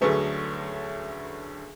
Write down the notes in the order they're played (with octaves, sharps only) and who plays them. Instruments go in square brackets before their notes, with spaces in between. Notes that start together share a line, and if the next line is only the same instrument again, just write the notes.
[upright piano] D2 D3 F#3 A3 C#4 [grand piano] G#4 B4